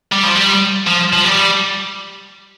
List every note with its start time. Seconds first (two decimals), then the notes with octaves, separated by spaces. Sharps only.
0.12 G3
0.24 F3
0.36 G3
0.87 F3
1.13 F3
1.25 G3